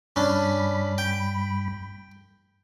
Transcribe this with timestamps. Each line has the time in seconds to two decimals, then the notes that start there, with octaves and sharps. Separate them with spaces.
0.16 G2 C#4 D4 B5
0.98 G5